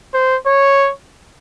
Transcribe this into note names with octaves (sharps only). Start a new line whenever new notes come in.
C5
C#5